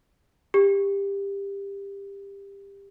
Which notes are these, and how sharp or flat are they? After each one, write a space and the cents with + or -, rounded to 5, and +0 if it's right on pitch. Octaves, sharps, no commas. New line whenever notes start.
G4 +20